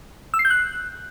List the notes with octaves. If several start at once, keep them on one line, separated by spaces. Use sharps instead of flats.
E6
C7
G6
F#6